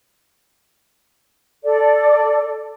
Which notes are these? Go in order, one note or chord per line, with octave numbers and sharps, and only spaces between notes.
A4 D5